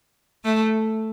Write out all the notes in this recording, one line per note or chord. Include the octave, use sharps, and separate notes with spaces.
A3